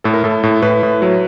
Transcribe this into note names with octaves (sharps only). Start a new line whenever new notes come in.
A2 A4
A#4
A2 A4
A2
A2 B4
A2
F#3